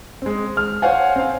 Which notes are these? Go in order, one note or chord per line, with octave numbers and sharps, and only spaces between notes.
G#3 C4
F6
C5 C#5 F5 F#5 G#5
C4 F5